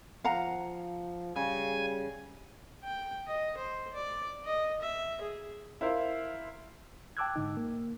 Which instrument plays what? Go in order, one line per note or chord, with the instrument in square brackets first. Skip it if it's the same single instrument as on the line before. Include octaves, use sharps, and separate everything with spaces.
[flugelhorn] F3 [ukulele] F5 F#5 A#5
[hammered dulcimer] C#3 [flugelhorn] G3 [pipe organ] G#5
[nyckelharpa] G5
D#5
C5
D5
D#5
E5
G#4
[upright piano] E4 A#4 C5 F5
[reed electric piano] G5 A5 D6 E6 F#6 G#6
G#2 D3 D#4
A#3